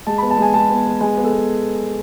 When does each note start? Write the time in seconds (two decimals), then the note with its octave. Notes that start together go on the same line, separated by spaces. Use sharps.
0.07 G#3 A5
0.18 B5
0.22 B3
0.30 A5
0.38 G#3 G#5
0.54 G#3 A5
0.69 B3
0.85 B3
1.01 G#3 G#5
1.17 B3
1.24 A4
1.33 B3